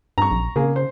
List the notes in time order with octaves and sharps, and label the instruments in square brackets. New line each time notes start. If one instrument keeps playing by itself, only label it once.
[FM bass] G2 [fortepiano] A#5 C#6
[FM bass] A#1
[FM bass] C#3 [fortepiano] A#3 G#4
[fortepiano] C5